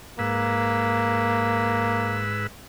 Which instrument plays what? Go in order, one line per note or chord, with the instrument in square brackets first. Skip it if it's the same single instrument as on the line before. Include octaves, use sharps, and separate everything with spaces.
[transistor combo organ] G#2 B4 E6 [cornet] A#3